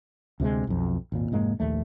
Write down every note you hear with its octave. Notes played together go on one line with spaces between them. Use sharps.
D2 C3 F#3 G#3
B1 F2
G#1 D#2 A#2
F1 G#2 G#3 A#3
A#1 D#2 A3